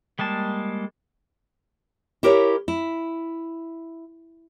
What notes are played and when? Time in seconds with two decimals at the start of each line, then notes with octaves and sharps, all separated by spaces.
0.19 G3 G#3 A#3 A5
2.23 E4 G4 A#4 C5 C#5
2.68 E4